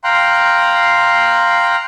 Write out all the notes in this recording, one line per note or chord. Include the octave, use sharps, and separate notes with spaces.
F5 G5 A#5 C6 F#6